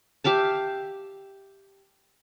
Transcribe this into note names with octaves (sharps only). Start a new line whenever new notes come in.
G4 E5 F5 A5